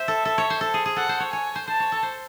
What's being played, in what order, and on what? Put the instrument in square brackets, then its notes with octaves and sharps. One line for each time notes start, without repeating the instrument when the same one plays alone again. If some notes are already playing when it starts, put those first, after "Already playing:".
Already playing: [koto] C5 [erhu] E5
[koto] A4
A4
C#5
C5
A4
G#4
G#4
[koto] A4 [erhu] F#5
[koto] C5
C#5
[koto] C#5 [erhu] G#5
[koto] C5
[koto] C5 [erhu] A5
[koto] C#5
A4
C5